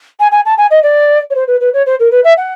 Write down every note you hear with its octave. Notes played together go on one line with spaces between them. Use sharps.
G#5
G#5
A5
G#5
D#5
D5
C#5
C5
B4
B4
C#5
C5
A#4
B4
E5
F#5